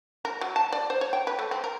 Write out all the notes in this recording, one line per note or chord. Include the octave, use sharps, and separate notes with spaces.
A#4
F#3
A5
D5
C5
C#5
G5
B4
A3
C4
A#4